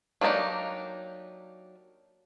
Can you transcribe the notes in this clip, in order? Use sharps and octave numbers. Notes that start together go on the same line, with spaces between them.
F#3 A#3 D4 D#4 G4